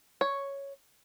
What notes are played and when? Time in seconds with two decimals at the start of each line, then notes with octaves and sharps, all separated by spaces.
0.21 C#5